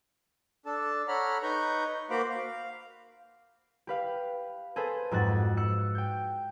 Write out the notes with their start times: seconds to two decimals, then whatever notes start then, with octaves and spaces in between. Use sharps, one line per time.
0.66 D4 A4 A5
1.08 A4 C#5 F#5 A#5 B5 F6
1.43 D#4 B4 A#5 C#6 G6
2.10 A#3 F#4 C5 F5 B5 D6
2.29 F5
3.87 G4 B4 F5
4.76 G#4 A4 B4 C5
5.11 F2 G#2 F#4 F#6 A6
5.57 E6 F#6 C#7
5.95 G5 G6